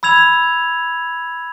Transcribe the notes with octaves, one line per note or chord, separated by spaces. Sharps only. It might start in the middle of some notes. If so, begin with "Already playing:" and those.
B5 E6 G#6 F7